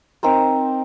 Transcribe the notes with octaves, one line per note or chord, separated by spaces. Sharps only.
C4 D#4 A#4 C5